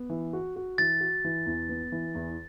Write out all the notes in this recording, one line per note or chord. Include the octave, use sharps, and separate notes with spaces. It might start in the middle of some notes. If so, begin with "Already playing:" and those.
Already playing: B3
E3
F#4
F#4
E3 A6
F#4
E3
E2
B3
E3
E2